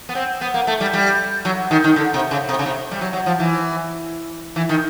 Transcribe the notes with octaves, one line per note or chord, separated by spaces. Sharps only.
B3
C4
B3
A#3
A3
G3
G3
F#3
D#3
D#3
D3
C3
C#3
C3
C#3
C3
G3
F#3
F#3
F3
E3
E3
D#3